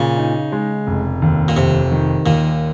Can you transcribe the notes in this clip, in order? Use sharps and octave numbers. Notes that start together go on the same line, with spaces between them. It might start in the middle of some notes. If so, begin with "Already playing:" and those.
Already playing: A#2 C#3
D#4
G#3
F1
D#2
A#2
F1 C3
D#3
D#2 A#2